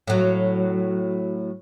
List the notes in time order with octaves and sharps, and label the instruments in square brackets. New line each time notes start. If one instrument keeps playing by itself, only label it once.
[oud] A2 F#3